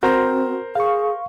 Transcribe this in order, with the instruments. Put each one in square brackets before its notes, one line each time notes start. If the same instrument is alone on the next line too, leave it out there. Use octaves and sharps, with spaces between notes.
[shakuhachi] C4 [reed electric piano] F#4 [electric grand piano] A#4 C5 A#5
[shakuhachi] G#4 [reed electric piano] F5 C#6